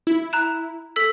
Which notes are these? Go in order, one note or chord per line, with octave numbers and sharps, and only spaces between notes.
E4
A#5 F#6 E7
A4 E6 B6